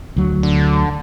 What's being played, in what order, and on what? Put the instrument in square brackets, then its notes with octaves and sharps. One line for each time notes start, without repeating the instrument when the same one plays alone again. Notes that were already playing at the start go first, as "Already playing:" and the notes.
[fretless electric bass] D2 F#3
[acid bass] D3